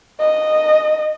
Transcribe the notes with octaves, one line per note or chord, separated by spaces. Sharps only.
D#5